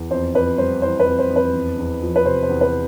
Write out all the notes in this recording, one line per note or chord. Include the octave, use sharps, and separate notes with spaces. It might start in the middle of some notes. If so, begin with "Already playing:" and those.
Already playing: E2
F2 C5
F2 B4
G3 C5
E3 C5
B4
F2
C5
F2
B4
E2
E2
F3
B4
C3 C5
C5
E2
B4